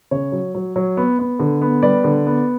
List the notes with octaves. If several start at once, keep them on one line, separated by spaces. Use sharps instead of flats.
C#3 C#5
F#3
F#3
F#3
B3
B3
D3
B3
G3 B4 D5
D3
B3